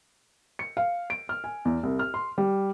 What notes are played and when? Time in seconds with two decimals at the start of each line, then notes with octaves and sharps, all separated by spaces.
0.59 C#7
0.77 F5
1.10 D7
1.29 F6
1.44 G#5
1.65 E2
1.83 C2
1.99 F6
2.14 C6
2.38 G3